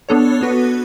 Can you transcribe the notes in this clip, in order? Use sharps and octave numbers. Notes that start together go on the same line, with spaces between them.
B3 D4 A4 C#5
B3 F#4 B4